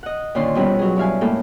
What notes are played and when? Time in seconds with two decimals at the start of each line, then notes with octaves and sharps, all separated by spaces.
0.03 D#5 F#5
0.35 A#2 D3 D#3 C#4 F4 C6
0.55 F2 B2 G3 C#4 B4
0.79 F#3 G#4
0.96 G2 E4 F5 G#5
1.21 A2 G#3 A#3 A4